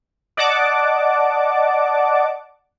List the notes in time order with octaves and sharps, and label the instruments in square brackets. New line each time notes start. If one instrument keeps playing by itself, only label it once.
[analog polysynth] D5 D#5 F#5 A5 D6